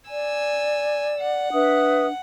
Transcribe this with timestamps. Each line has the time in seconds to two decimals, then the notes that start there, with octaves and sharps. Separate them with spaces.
0.10 D5 G#5 E6
1.19 F#5
1.53 D4 B4 E5 D#6